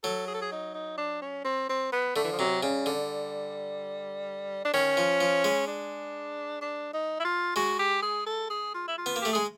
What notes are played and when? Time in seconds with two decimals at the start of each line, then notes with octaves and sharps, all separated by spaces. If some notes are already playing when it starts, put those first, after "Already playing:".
0.04 F#3 A4
0.27 G#4
0.34 A4
0.42 G#4
0.52 D#4
0.74 D#4
0.98 D4
1.22 C#4
1.45 C4
1.69 C4
1.93 B3
2.16 D3 A3
2.24 E3
2.32 F3
2.39 C3 F#3
2.63 C#3 G3
2.86 D3
4.65 D4
4.74 D#3 C#4
4.97 F3
5.21 F3
5.44 G#3
5.68 D4
6.62 D4
6.93 D#4
7.20 E4
7.24 F4
7.56 G#3 F#4
7.79 G4
8.03 G#4
8.26 A4
8.50 G#4
8.74 F4
8.88 E4
8.98 F4
9.06 B3
9.16 A#3
9.21 A3 G4
9.33 G#3 G#4